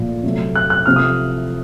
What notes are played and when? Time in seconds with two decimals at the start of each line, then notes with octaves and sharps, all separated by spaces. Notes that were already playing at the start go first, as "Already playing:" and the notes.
Already playing: A#2 F3 A3
0.23 C3 F#3 A3
0.56 F#6
0.70 F#6
0.86 C3 F3 A3 F6
0.96 D#6